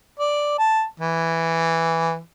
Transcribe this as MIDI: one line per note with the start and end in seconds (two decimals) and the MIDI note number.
0.19 0.55 74
0.59 0.84 81
1.00 2.19 52